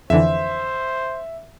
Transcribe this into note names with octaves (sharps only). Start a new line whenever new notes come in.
F2 D3 E3 C5 E5